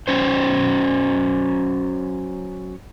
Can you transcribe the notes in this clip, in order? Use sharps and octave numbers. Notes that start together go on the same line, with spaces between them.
F#3 C#4 C5